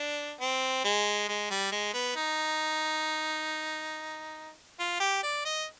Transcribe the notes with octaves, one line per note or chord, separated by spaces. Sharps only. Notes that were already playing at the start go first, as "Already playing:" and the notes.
Already playing: D4
C4
G#3
G#3
G3
G#3
B3
D#4
F4
G4
D5
D#5